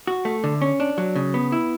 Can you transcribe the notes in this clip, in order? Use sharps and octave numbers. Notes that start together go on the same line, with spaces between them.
F#4
A3
D3
C#4
D4
F#3
C#3
B3
E4